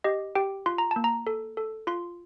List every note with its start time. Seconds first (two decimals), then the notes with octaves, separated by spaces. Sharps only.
0.04 G4 D#5
0.35 G4 G5
0.66 F4 C6
0.78 A#5
0.91 A5
0.96 A#3
1.04 A#5
1.27 A4
1.57 A4
1.87 F4 C6